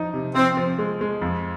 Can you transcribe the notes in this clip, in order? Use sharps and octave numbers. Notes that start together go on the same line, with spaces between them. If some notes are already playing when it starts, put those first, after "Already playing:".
Already playing: F3 D#4
C3
F3 C4
F3
G#3
G#3
F2